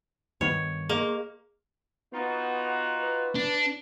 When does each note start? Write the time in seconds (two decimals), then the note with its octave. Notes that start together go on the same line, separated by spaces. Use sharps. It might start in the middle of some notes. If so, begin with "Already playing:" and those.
0.41 G2 D#3 B3 C#5
0.89 A#3 G#4 D#5
2.13 B3 D#4 F4 F#4
2.96 B4
3.35 D4